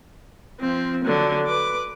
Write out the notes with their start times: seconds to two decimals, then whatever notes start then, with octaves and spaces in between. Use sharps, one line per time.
0.60 F3 C4
1.05 D3 F#3
1.47 B4 D6